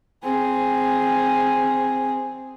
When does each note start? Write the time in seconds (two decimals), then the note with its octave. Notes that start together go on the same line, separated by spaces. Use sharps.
0.23 C4 G#4